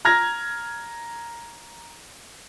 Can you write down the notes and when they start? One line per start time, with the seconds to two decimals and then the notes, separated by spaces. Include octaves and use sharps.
0.05 A#5 F6 G#6 A#6